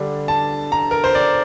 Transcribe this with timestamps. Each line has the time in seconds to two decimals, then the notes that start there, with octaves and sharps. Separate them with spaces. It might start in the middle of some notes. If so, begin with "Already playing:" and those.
Already playing: D3 G3 D4
0.28 A5
0.72 A#5
0.91 A#4
1.04 C5
1.15 D5